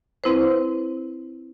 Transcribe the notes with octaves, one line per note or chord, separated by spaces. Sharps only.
C4 E4 B4 C5